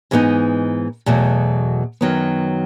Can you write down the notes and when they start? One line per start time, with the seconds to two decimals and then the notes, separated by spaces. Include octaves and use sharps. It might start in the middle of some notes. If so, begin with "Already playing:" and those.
0.11 G#2 E3 B3 D#4
1.06 E2 B2 F#3 A3
2.01 F#2 D#3 F#3 B3